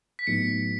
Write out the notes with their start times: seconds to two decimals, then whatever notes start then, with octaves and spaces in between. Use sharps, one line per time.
0.19 B6
0.27 A2 F#3 B3 D#4 C#7